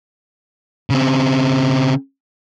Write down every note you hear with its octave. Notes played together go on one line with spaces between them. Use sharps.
C#3 C4